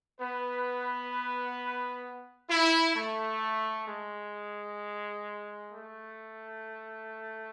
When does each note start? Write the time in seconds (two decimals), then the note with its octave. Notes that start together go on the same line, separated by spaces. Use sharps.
0.20 B3 B4
2.50 E4
2.96 A3
3.88 G#3
5.73 A3